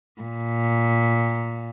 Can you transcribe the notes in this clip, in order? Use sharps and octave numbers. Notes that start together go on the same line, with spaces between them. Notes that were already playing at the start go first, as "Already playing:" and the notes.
A#2